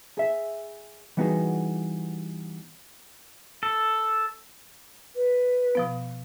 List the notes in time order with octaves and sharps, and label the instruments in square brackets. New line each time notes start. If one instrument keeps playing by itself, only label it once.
[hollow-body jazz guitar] G#4 E5
E3 G3 B3 D#4 F#4 G#4
[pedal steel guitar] A4
[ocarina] B4
[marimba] B2 F3 B3